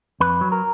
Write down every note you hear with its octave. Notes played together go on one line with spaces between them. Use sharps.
F2 B4
F#3
A#4